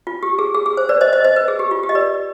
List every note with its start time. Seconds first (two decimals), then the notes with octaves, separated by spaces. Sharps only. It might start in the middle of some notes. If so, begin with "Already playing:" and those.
0.07 F4
0.23 G4
0.39 G#4
0.55 G#4
0.66 G#4
0.77 C5
0.89 B4 D5
1.01 C5 D#5
1.13 C5 D#5
1.24 C5 D#5
1.36 B4
1.48 G#4
1.59 G4
1.71 F4
1.83 G4
1.89 D#5
1.95 B4 D5